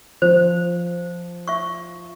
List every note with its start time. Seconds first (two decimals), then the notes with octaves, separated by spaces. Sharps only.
0.22 F3 C5
1.48 E5 C#6